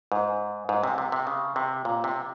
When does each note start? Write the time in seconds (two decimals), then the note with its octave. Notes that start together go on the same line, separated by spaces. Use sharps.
0.12 G#2
0.69 G#2
0.83 C3
0.98 C3
1.12 C3
1.27 C#3
1.56 C3
1.85 A#2
2.04 C3